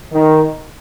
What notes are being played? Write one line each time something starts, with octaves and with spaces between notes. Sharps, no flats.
D#3